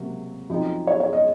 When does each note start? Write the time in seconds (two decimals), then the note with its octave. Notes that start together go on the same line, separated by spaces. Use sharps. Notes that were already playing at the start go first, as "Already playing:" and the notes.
Already playing: C#2 C3 F#3 A#3
0.50 F#2 F3 C4 D#4
0.87 C#5
1.00 C#5
1.13 D#5